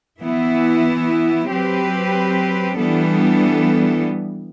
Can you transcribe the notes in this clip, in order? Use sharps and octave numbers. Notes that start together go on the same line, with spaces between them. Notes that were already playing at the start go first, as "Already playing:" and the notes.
E3 B3 E4
F#3 C4 G4 B4
E3 G3 B3 D4 A4